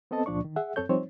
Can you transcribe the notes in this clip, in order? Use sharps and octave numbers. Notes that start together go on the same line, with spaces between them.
B3 C4 A4 D#5 A5
C#2 A#2 F3 D4 D5 C#6
D#3
G#4 E5 F#5
F#2 C4 A4 C#5 G6
F3 G3 C4 D#4 C5 C#5